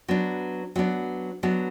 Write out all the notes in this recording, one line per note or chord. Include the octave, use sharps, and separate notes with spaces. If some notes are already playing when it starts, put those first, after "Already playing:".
F#3 B3 D4
F#3 B3 D4
F#3 B3 D4